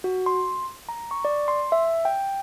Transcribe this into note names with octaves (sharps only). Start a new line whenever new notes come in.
F#4
C6
A#5
C#6
D5
C6
E5
G5